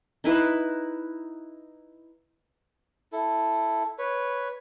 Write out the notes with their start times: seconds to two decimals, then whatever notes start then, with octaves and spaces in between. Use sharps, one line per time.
0.24 D#4 E4 B4
3.12 E4 A4
3.98 B4 C#5